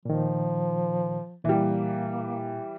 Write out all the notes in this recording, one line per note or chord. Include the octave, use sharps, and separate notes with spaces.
A#2 D#3 F3
A#2 E3 G3 A#3